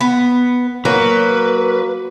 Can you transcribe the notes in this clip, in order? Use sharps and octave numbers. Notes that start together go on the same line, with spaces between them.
B3
F#3 A#3 B4